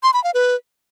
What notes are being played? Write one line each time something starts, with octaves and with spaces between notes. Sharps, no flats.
C6
B5
F5
B4